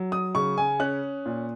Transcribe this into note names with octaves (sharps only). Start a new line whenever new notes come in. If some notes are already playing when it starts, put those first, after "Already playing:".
Already playing: F#3
D#6
C#3 C#6
G#5
C#4 F#6
A#2